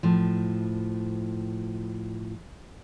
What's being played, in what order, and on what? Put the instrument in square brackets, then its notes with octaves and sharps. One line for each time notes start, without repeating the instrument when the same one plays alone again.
[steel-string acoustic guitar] A2 F3